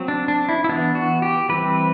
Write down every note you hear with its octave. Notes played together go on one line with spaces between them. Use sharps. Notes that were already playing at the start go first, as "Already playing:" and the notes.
Already playing: F#3 C4
D4
D4
E4
E4
E3 B3 D4
F#4
G4
E3 G3 C4 B4